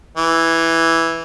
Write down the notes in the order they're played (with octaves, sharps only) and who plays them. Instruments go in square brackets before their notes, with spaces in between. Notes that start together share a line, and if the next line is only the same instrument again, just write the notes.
[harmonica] E3